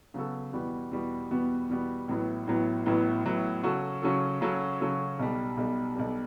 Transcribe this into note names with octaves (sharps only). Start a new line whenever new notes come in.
C#3 F#3 B3 F#4 A4
E2 B2 G3 B3 F#4
E2 B2 G3 B3 F#4
E2 B2 G3 B3 F#4
E2 B2 G3 B3 F#4
A1 A2 F#3 B3
A1 A2 F#3 B3
A1 A2 F#3 B3
A1 A2 F#3 B3
C#3 F#3 C#4 F#4 A4
C#3 F#3 C#4 F#4 A4
C#3 F#3 C#4 F#4 A4
C#3 F#3 C#4 F#4 A4
B1 B2 G3
B1 B2 G3
B1 B2 G3